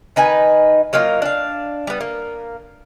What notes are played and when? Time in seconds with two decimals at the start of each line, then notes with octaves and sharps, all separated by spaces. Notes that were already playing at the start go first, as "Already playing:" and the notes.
0.16 D#3 D#4 B4 G#5
0.93 F#3 A#3 D#4 F4
1.22 D4 F5
1.87 G3 B3
2.01 A#3